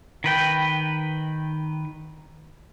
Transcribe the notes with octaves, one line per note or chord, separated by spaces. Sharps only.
D#3 B4 G5